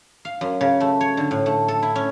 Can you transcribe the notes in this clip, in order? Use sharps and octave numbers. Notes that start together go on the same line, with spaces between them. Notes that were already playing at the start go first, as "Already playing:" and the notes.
F5
F#2
C#3
A3
C#5
D3
A2
A3
A4
E4
C#4